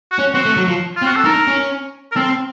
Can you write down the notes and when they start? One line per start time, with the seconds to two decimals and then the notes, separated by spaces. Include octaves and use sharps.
0.12 F#4
0.19 C#4
0.34 C4 F#4
0.45 A3
0.57 F#3
0.68 F3
0.96 F4
1.02 C4
1.07 F#4
1.16 A4
1.25 D#4 A#4
1.47 C#4
2.12 A#4
2.16 C4 A4